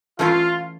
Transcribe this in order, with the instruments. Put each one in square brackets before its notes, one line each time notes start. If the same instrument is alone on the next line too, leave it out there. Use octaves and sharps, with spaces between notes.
[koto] E3 A3 C#4 E4 A4 [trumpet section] F4